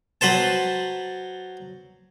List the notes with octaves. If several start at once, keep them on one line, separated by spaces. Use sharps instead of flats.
F#3 B4 C5 A5